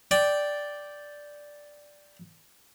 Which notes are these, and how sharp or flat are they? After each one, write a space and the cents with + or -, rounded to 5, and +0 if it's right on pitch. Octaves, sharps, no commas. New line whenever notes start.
D5 +0 G5 +0